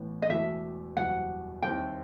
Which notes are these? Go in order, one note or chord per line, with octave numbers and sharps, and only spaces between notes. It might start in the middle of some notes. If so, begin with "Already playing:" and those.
Already playing: A1 A2 E3 B3
D#5
E1 E2 B2 A3 E4 E5
F#1 E2 B2 G3 F#5
D#2 D#3 G3 C4 E4 G5